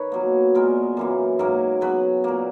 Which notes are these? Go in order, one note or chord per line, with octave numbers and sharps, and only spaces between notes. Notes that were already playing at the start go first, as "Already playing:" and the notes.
Already playing: D#3 B4 C#5 D#5
B2 F#3 A#3
A#2 G#3 B3 A#4
F#2 E3 A#3
G#2 F#3 A#3 A#4
C#3 F#3 B3 B4
A#2 A#3